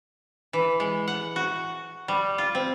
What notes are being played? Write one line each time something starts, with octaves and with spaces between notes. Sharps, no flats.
E3
G#3
F#5
F#4
G3
F4
C4